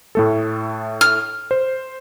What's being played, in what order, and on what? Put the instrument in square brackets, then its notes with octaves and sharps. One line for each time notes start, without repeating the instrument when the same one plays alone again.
[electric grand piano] A2 A3 A4
[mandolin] F6
[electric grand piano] C5